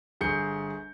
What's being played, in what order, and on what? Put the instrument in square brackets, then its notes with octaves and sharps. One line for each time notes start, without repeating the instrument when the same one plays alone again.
[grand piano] G1 G#4 G6 C#7